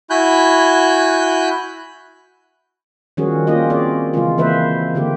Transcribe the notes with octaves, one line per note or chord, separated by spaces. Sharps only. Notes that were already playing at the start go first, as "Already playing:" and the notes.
E4 F#4 G#5 B5 F#6 G6
D#3 F3 G3 C#4 F#4 G#4
A#3 C#4 F4 G4 D#5
C4 G#4 D5
C#3 E3 G#3 F4
E3 A#3 C4 B4 C5 E5
D3 A#3 G4